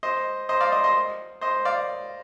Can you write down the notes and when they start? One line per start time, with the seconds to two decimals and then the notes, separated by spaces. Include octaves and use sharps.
0.03 C5 D#5
0.49 C5 D#5
0.61 D5 F5
0.72 C5 D#5
0.84 C5 D#5
1.41 C5 D#5
1.65 D5 F5